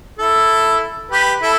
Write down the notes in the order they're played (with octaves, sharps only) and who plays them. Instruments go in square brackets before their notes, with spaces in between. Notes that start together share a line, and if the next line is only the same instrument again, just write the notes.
[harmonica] E4 A4
G4 B4
E4 A4